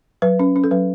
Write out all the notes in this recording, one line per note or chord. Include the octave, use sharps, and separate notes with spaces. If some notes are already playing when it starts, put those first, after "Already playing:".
F#3 B4
C#4
C#4
A4
F#3 B4